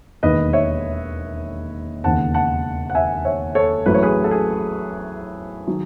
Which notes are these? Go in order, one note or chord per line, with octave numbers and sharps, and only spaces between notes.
E1 D#2 D#3 B4 D#5
C#5 E5
E1 D#2 C#3 F#5 A5
F#5 A5
F#5
E5 G#5
C#5 E5
A4 C#5
A1 A2 F#3 A3 B4
C#5
G#4 B4
A4
G#4
D#3 F#3